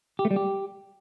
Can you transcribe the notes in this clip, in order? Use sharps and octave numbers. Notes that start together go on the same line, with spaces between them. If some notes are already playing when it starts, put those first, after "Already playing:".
G4
A3
G3
G4